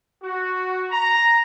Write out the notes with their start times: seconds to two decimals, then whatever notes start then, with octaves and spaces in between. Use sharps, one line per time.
0.22 F#4
0.91 A#5